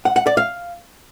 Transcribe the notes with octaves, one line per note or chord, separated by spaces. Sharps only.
F#5
F#5
D5
F5